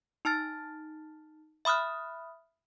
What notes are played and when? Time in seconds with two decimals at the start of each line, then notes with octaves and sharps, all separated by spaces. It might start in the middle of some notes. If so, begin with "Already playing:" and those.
0.25 D#4 A5 F6 A6
1.65 E5 B5 D#6 F6 F#6